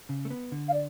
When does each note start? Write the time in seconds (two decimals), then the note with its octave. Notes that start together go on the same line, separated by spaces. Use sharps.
0.09 C#3
0.25 A3
0.30 B3
0.52 D3
0.68 F5
0.73 D5